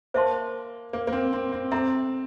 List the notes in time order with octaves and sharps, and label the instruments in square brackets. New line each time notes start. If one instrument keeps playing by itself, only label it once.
[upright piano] A#3 [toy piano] C5 E5 A5 C6
[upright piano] A#3
A#3
C4
C4
C4
[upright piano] C4 [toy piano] A4 E5 A#5